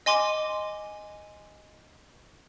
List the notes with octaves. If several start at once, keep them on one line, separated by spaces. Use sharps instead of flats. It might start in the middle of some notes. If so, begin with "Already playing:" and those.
D#5 G#5 C6 D6